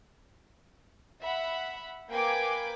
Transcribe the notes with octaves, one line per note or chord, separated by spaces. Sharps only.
E5 F#5 B5
A#3 B4 G5 G#5 D6